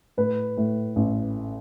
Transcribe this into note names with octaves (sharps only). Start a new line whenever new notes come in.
A2 B4
A2
A1